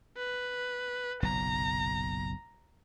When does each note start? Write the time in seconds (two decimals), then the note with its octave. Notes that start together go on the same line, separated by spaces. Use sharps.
0.17 B4
1.22 F#1 B1 A#2 A#5